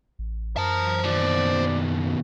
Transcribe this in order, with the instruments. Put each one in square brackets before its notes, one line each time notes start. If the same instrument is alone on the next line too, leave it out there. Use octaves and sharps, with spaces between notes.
[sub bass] A1
[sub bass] F#2 [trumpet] A#4 [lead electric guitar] C5 A5
[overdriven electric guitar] D#2 B2 [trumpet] D5